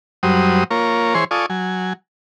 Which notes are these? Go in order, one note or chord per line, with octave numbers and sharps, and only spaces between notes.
F#2 F#3 G3 C5 D#6
A#3 F4 A#4 C#5
E3 G#4 C5 C#5 C6
F4 A4 D5 G#5 C#6 D#6
F#3 G#5